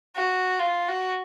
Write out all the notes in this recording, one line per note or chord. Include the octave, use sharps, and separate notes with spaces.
F#4
F4
F#4